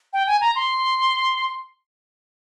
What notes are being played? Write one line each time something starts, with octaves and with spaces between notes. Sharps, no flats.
G5
G#5
A#5
C6